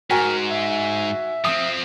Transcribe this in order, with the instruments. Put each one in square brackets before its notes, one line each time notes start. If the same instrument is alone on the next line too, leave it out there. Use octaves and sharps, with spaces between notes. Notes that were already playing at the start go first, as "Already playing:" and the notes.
[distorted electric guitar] G#2 [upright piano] F#4 G#5 [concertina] A#4
[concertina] E5
[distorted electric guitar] F3 C4 [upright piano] D#6